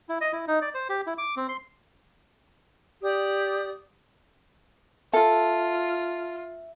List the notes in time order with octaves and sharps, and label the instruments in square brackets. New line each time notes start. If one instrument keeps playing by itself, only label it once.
[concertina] E4
D#5
E4
D#4
D5
C5
G4
E4
D6
C4
C6
[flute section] G4 D5 D#6
[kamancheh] F4 [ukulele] A4 [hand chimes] E5